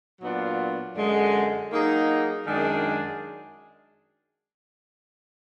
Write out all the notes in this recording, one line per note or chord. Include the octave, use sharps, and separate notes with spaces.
A#2 F#3 B3 D4 F4
F#2 D3 G#3
F#3 A#3 D#4 G#4
F#2 D#3 G#3 D4 G#4